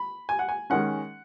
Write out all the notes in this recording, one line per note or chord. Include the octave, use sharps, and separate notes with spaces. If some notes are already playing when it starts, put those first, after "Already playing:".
Already playing: B5
G#5
F#5
G#5
D#3 G#3 C#4 F#5